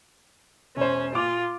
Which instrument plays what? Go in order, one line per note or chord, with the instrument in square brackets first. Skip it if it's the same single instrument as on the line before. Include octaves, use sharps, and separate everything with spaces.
[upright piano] E1 C5 [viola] C#4
[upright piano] A#2 D6 F7 [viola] F4